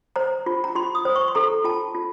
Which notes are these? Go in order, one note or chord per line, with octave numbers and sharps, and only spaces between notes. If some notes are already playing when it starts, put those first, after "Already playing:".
C5 A#5
F4
A#5
F4 C6
D#6
C5
C#6
C6
A4 A#5
F4 A5
F4